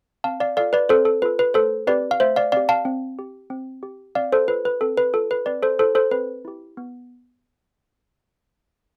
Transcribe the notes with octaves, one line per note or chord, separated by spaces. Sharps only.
C4 F5 A5
D5 F5
F4 A4 D5 F5
B4 D5
C4 A4 C5
A4
F4 A4 B4
B4
A3 A4 C5
C4 G4 B4 D5
F5
A3 C5 E5
D5 F5
C4 G4 D5 F5
F5 A5
C4
G4
C4
G4
C4 D5 F5
A4 C5
F4 A4 B4
B4
C4 A4
B4
F4 A4
B4
C4 B4 D5
A4 C5
E4 G4 A4 C5
A4 C5
C4 B4
E4 G4
B3